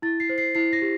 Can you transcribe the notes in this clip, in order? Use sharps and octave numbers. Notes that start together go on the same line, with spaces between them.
E4 A6
C7
C5
C7
E4 C7
A#6
G4